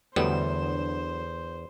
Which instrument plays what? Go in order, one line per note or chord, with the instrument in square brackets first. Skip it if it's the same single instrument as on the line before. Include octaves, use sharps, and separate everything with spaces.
[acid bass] E2 [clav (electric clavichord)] A2 G3 B3 [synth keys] D3 F#3 E7 [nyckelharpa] C5